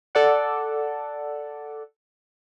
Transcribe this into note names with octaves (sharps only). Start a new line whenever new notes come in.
A4 D5 F#5